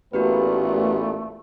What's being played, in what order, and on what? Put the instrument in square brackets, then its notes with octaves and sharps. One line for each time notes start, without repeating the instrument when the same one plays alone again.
[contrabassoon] A1 [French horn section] A#2 B3 [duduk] A3 [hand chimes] F#4 G4 B4